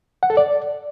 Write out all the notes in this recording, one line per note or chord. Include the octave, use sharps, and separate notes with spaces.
F#5
A4
D5